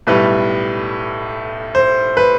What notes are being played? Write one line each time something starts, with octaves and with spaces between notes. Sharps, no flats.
B1 A2 G3 B4
C5
B4